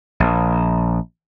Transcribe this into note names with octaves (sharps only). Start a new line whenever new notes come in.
A#1